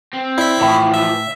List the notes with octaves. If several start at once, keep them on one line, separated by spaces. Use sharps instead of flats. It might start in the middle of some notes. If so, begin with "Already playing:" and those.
C4
E4 D5 B6
A2 E3 F3
E5